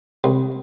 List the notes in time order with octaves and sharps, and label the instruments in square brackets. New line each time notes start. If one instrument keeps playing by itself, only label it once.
[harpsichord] C2